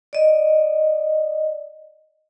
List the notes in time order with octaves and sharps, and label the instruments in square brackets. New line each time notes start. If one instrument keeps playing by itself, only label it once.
[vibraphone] D5 D#5